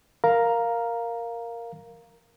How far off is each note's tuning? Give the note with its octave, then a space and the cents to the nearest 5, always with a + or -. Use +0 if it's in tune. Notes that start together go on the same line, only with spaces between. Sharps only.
A#4 +0 F5 +0 A#5 +5